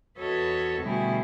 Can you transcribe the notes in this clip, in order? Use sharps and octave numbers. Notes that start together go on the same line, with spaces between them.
E2 F#4 A4 B4 C#5 D#5
B2 D3 G3 A3 E4 G#4